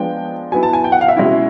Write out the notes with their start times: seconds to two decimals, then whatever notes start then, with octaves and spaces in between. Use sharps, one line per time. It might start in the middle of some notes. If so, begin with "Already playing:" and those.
Already playing: F3 G#3 B3 D4 G5
0.52 F#3 B3 E4 G#5
0.63 A5
0.73 G#5
0.84 G5
0.92 F#5
1.01 F5
1.08 E5
1.16 B2 G#3 C#4 E4